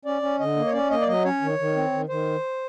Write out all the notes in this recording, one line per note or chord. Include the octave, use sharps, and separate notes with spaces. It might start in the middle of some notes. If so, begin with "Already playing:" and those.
C#4 D5
C#4
D3 D#5
A#3
C#5
C#4 D5
A#3 D#5
D5
F#3 D#5
C#4 C#5
D#3
D#3
C4
D#3
D#3 C5